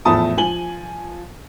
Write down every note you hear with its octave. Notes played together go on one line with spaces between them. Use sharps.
E2 A2 F3 A3 A5 D#6
F3 G#5 F#7 G7